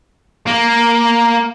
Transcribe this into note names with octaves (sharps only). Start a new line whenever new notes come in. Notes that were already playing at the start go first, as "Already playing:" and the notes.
A#3